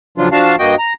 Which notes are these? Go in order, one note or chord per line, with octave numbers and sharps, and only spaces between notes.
C#3 F3 F#3 D4 F4
F3 D4 F#4 F5 A5
G2 A#3 F#4 D#5 G5
A#5